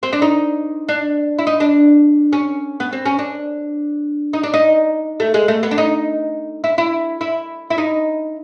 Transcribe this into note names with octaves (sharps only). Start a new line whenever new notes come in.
C4
D4
D#4
D4
E4
D#4
D4
C#4
B3
C4
C#4
D4
D#4
D4
D#4
A3
G#3
A3
B3
D4
D#4
E4
E4
E4
E4
D#4